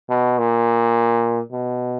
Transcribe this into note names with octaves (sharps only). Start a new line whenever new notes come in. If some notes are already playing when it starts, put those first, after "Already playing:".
B2
A#2
B2